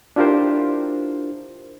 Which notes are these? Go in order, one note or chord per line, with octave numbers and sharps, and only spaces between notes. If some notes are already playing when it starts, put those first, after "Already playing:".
D4 E4 F4 G4 A#4 C5